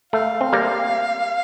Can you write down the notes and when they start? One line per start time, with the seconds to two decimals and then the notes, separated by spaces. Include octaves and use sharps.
0.13 A3 F5
0.41 C4
0.53 G3 A#3